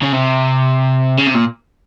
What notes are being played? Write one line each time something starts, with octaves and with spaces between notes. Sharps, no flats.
C#3
C3
C#3
C3
A#2